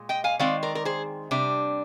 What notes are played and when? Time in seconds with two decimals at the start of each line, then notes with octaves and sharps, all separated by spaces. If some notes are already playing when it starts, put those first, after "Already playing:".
Already playing: A#2 G#3
0.09 D#5 G5
0.24 F5 G#5
0.39 D#3 G#3 C4 D5 F5
0.63 A#4 D5
0.75 A#4
0.85 G#4 C5
1.31 C3 G3 D4